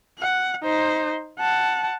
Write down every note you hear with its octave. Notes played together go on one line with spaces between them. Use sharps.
F#5
D#4 C5
F#5 A5